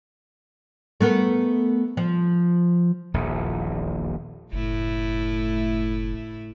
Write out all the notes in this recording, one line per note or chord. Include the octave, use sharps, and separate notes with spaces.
A3 B3 A#4
F3
D#1 A#1 E2
F#1 A2 A3 E4